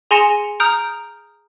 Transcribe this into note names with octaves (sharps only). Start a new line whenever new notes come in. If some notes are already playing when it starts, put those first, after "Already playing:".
G#4 G#5 C6 A#6 C#7 E7
A#5 D#6 F6 G6 D7